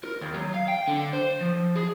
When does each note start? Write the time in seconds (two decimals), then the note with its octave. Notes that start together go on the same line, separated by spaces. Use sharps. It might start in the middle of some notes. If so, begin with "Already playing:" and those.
0.04 A#4
0.21 D#2
0.36 F#3
0.54 F5
0.68 G5
0.88 D3
1.13 C5
1.41 F3
1.76 G#4